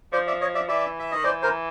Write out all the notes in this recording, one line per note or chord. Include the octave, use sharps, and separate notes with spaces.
F3 C5 D5
D5 E5
C#5 D#5
D5 E5
E3 D5 E5
E5
D#3 D#5
E3 C5 D5
A#4 C5